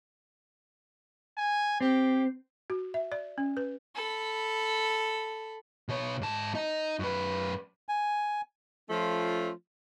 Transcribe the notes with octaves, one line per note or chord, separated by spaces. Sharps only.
G#5
C4 G4
F#4
E5
D5
C#4
B4
A4 B5
B2 C#5
G#2 A5
D#4 D#5
F#2 B4
G#5
F3 A3 C#4 F4